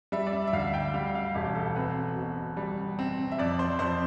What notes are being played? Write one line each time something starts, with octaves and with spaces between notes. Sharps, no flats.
G3 E5
D5
E5
E5
D2 F5
G5
G3 F5
F5
E1 G4
A4
C4 B4
B2
G3
C4
E5
F2 D5
C5
F2 C5